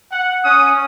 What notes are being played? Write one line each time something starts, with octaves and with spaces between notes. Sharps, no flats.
F#5
C#4 D#6